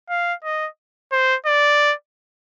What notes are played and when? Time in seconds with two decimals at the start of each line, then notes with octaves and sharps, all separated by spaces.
0.10 F5
0.44 D#5
1.12 C5
1.46 D5